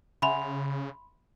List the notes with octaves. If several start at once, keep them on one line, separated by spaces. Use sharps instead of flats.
C#3 E5 F#5 G#5 B5 C6 F7